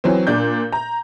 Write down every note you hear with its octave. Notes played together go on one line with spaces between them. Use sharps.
E3 F#3 C4
A#2 D4 G6
A#5